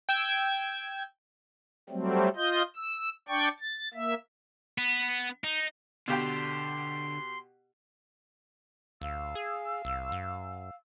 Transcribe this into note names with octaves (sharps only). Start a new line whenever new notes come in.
G5 E6 G#6
F#3 G3 A3 C4
F4 D#5 G6
E6
D4 D5 G5 C#6
A6
A#3 E5
B3
D#4
B2 D3 G4 G5 C6
D2 F5 E6
G#4
C2
F#2